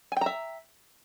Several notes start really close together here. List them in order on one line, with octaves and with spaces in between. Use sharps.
G#5 G5 A#5 E5